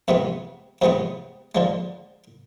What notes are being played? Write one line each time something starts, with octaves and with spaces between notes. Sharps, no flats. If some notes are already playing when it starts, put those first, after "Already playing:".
F2 C3 E3 G#3 B3
F2 C3 E3 G#3 B3
D3 F3 G#3